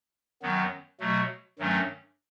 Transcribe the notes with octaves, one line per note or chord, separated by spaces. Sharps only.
F#2 D#3 F#3 B3
B2 F#3 A3
G2 D#3 F#3 A3 C#4